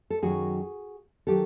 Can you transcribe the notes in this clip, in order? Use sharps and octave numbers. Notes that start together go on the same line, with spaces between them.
A4
F#2 D#3 F#3 F#4 G#4
D#3 F#3 G4 A4